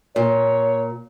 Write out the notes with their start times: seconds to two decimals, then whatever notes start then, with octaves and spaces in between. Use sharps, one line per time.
0.16 A#2 C#5